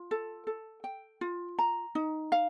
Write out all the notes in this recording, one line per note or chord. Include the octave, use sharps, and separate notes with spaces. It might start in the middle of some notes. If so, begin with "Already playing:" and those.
Already playing: F4
A4
A4
G5
F4
A#5
D#4
F5